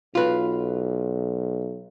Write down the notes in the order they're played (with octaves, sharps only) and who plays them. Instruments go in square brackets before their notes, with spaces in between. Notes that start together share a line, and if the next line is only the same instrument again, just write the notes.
[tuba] B1 [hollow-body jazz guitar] F4 B4